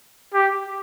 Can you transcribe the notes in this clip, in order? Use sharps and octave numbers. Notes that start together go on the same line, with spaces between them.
G4